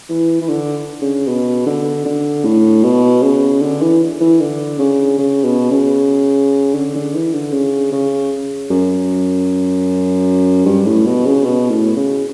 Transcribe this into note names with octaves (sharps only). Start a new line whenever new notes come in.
E3
E3
D3
C#3
B2
D3
D3
A2
B2
C#3
D3
E3
E3
D3
C#3
C#3
B2
C#3
D3
D3
E3
D3
C#3
C#3
F#2
G2
A2
B2
C#3
B2
A2
C#3